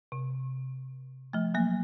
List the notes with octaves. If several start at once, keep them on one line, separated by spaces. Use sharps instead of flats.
C3
F3 A3
F#3 A#3